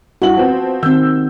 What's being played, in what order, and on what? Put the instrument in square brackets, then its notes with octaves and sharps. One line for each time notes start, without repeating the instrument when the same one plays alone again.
[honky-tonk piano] G2 E4 F#7 [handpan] F#4
[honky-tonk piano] F3 B3 C4
[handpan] D#3 C4 [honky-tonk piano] E6 G6